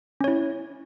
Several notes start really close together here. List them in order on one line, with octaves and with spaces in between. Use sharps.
C#4 C#5 E4